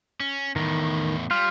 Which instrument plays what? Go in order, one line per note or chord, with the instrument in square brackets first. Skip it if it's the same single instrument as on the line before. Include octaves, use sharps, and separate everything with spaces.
[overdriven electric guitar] C#4
[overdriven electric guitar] E2 A2 [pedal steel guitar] D#3
[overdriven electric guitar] G3 [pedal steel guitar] F4